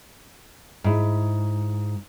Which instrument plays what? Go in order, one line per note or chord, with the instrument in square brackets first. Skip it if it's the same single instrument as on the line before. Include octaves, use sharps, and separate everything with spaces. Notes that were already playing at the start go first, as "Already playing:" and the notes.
[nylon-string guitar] G#2 E4